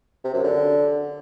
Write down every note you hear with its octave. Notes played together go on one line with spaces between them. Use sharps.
C3
F#2
D3